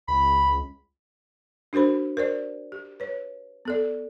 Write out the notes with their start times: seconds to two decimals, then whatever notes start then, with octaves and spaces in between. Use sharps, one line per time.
0.08 C#2 B5
1.73 D4 F#4 A#4 C5 B5
2.17 A#4 C5 D5
2.72 G4
3.00 B4 C#5
3.65 B3 A4 D5